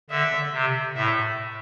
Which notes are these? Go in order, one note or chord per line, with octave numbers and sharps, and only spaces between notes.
D3 E5
C3
A2 E5